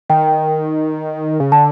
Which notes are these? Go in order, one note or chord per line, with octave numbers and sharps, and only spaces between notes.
D#3 G5
C#3
D3 A5